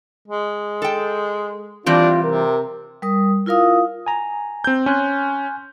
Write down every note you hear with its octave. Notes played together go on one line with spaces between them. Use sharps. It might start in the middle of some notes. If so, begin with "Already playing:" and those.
G#3
A4 G5
E3 G3 C4 D4 F4
C3 A#4
G3 A#4 D#6
E4 F4 A#4 F5 D#6
G#5 A#5
C4 G6
C#4 G#5 C6 F#6